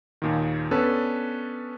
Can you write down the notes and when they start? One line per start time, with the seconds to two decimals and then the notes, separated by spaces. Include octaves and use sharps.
0.22 D#2 A#2 D#3
0.71 B3 C#4 D4 A4 B4